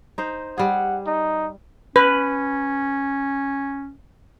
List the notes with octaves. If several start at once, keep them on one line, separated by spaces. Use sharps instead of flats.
D#4 C5
G3 G#4 F#5
D#4
C#4 B4